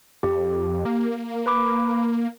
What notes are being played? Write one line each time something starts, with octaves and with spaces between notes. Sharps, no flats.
F2 G4
A#3
B4 B5 D6